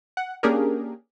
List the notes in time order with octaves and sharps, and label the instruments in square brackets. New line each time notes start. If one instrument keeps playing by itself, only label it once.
[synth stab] F#5
A#3 C#4 D4 G4 G#4 A#4